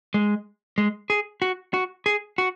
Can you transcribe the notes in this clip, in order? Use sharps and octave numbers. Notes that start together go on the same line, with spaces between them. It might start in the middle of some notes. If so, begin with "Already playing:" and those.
G#3
G#3
G#4
F#4
F#4
G#4
F#4